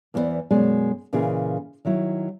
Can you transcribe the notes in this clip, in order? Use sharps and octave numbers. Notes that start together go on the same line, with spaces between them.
E2 E3 B3 A4 C5 D5
F#2 B2 G#3 D5 G#5
A#2 C#3 E3 E4 G#4
D#3 F#3 E4